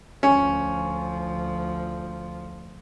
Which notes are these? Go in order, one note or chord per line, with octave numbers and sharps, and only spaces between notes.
D2 F3 C#4